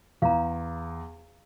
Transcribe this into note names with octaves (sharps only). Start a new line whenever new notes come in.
E2 F5 A#5